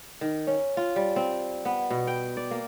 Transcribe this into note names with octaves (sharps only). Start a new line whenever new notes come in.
D#3
C#4
F4
G3
C4
B3
B2
G5
D5
A#3